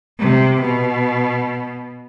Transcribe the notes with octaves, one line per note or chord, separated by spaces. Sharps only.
C3
B2